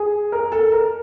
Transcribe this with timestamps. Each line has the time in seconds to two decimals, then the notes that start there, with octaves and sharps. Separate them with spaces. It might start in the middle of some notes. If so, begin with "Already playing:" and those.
Already playing: G#4
0.32 A#4
0.52 A4
0.72 A#4